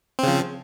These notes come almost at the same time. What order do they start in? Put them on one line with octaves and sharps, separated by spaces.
C4 C#3 F3